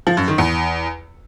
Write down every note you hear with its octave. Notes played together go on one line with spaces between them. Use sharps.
F3
F#2
D#3
E2